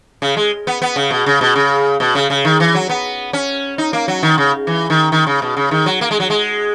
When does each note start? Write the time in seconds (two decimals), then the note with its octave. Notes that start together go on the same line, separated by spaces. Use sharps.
0.22 C#3
0.37 G#3
0.67 B3
0.82 B3
0.96 C#3
1.11 B2
1.26 C#3
1.41 B2
1.56 C#3
2.00 B2
2.15 C#3
2.30 C#3
2.45 D#3
2.60 E3
2.75 F#3
2.89 B3
3.33 C#4
3.78 D#4
3.93 A#3
4.08 F#3
4.23 D#3
4.38 C#3
4.67 E3
4.90 D#3
5.12 D#3
5.27 C#3
5.42 B2
5.57 C#3
5.71 D#3
5.86 F#3
6.01 A#3
6.11 G#3
6.20 F#3
6.30 G#3